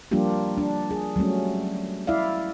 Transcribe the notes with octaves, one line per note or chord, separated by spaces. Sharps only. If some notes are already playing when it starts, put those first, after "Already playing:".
F3 G3 A#3 D4 F4 G4
D4
G#4
F#3 G3 A3 C#4
E4 D5 E5 F5